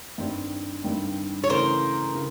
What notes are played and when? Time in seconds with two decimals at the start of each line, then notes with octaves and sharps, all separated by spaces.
0.18 G2 D#3 G3 C4
0.84 G2 D#3 G3 C4
1.44 C#5
1.49 C#3 E3 A3 A#4 C5
2.15 C#3